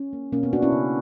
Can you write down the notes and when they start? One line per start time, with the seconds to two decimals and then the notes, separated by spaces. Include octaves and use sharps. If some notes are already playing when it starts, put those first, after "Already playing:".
Already playing: C#4
0.13 A#3
0.32 B2 A#3 C#4
0.43 B3
0.53 A#3 D4 F#4
0.62 C#4 E4
0.72 C#3